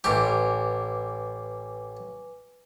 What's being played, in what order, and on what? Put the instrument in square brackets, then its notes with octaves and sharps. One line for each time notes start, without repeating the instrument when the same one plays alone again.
[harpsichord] A1 G4 [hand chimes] B4 G#5 D6